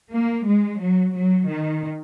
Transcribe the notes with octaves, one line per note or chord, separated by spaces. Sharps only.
A#3
G#3
F#3
F#3
D#3